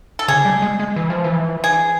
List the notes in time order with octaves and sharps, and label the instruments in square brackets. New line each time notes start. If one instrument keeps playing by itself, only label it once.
[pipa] A4
[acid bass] C#3 [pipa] G#4
[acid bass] G3
G#3
G#3
E3
F3
E3
[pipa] G#4